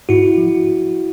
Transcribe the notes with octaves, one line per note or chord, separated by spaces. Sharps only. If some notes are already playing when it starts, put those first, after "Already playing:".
G#2 E4 F#4
F3